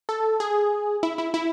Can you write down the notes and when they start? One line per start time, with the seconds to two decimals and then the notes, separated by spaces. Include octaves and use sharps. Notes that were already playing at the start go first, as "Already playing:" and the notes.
0.09 A4
0.40 G#4
1.03 E4
1.18 E4
1.34 E4